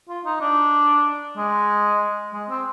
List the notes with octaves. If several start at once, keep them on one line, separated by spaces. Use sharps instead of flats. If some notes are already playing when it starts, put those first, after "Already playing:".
F4
D#4
D4
G#3
G#3
C4